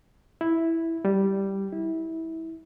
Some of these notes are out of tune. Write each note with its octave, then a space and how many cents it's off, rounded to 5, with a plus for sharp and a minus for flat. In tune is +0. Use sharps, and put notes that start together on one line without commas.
E4 -5
G3 -5
E4 -25